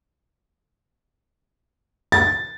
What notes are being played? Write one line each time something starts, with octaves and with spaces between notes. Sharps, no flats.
A6